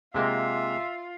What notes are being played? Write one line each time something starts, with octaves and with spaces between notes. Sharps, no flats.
C3 G#3 A#3 F4 E5